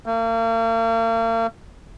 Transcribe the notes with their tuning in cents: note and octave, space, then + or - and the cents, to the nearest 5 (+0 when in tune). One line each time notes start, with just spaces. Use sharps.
A#3 -40